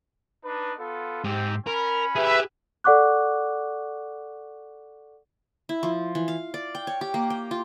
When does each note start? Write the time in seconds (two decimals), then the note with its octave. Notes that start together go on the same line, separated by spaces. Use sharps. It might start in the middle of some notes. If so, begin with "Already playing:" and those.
0.45 D4 D#4 B4
0.79 B3 F4 A4
1.24 G#2 C4 G4
1.67 C#4 A#4 B5
2.16 G4 G#4 B4 E5
2.84 A4 D5 F#5 C#6 D6 F#6
5.69 E4
5.83 F3
6.15 E3
6.28 F5
6.54 D5
6.75 G5
6.87 C#5
7.01 G4
7.14 A#3
7.30 G5
7.51 F4